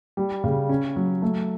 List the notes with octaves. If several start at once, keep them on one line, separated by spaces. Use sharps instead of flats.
G3
C#3
C#4
F#3
A3